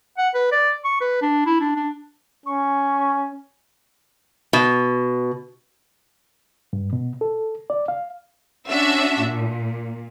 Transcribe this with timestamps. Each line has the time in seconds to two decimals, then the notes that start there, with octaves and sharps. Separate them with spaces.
0.18 F#5
0.34 B4
0.52 D5
0.84 C#6
1.01 B4
1.22 D4
1.46 E4
1.61 D4
1.76 D4
2.46 C#4 C#6
4.53 B2
6.73 G2
6.93 B2
7.21 A4
7.70 D5
7.88 F5
8.68 C#4 D4 F#4 E5
9.20 A#2